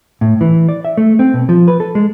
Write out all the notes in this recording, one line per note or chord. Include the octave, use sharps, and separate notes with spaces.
A2
E3
D5
E5
A3
C4
B2
F3
B4
A4
G#3